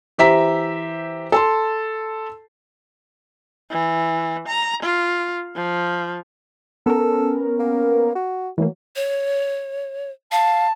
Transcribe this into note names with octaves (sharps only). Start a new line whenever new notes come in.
E3 G4 C5 E5 A#5 B6
A4 A5 C6
E3
A#5
F4
F3
B3 C#4 A4 A#4
A#3
F#4
E3 F#3 A3 A#3
C#5
F5 A5